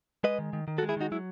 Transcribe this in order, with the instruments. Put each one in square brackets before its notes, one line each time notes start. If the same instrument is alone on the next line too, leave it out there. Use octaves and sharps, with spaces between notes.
[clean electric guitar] G#3 B4 D#5
D#3
D#3
D#3
F#4 A4
G#3
E4 G#4
D#3 D#4 F#4
F#3 E4